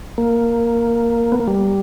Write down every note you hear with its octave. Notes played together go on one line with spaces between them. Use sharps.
A#3
B3
A#3
G3